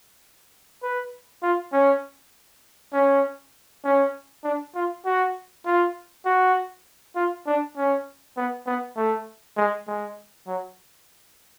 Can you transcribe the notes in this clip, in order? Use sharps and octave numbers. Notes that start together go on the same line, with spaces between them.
B4
F4
C#4
C#4
C#4
D4
F4
F#4
F4
F#4
F4
D4
C#4
B3
B3
A3
G#3
G#3
F#3